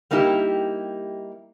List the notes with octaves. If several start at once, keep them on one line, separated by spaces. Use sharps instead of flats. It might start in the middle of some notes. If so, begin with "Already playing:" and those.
G3 A#3 D#4 E4 G4